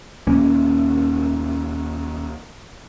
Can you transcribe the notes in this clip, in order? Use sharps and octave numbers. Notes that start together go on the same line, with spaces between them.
D#2 A#2 A#3 C#4